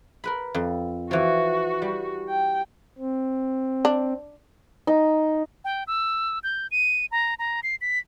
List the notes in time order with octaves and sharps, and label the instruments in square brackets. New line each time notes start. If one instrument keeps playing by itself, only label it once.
[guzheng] A#4 B4 B5
F2
[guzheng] E3 F3 [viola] F#4
[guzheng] G3
[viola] G5
[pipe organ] C4
[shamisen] D4
[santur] D#4
[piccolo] G5
E6
G6
D#7
A#5
A#5
C7
B6